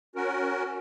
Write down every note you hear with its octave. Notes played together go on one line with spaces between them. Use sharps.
C#4 F#4 A#4